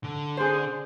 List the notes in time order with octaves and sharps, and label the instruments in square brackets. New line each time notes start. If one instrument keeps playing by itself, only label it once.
[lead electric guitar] D3
[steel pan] G#4 C5